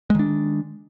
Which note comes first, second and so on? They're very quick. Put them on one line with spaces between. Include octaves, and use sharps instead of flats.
G#3 D#3 D4